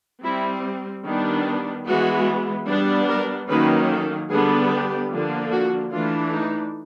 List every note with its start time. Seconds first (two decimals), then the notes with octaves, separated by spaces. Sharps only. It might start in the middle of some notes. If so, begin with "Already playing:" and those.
0.23 G3 C4 E4
1.04 D#3 G3 B3 D4
1.85 E3 G#3 B3 F#4
2.67 G3 B3 D4
3.08 A#4
3.48 D#3 F#3 A#3 C#4 B4
3.89 A4
4.29 D3 G3 B3 D4 G#4
4.70 G4
5.10 D3 F3 A#3 D4
5.51 F#4
5.91 E3 A3 D4 F4
6.32 D#4